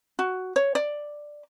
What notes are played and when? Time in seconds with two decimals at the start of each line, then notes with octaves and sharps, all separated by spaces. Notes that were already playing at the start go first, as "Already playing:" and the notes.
0.19 F#4
0.56 C#5
0.75 D5